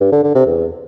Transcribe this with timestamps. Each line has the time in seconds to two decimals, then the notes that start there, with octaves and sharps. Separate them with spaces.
0.01 G2
0.12 D3
0.23 D3
0.35 C3
0.46 E2